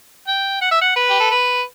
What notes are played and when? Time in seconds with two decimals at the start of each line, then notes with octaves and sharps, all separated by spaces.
0.27 G5
0.61 F#5
0.71 E5
0.81 F#5
0.96 B4
1.10 G4
1.20 A4
1.31 B4